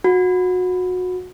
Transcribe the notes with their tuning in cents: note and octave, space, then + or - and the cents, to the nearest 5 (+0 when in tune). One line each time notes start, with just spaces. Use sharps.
F#4 -25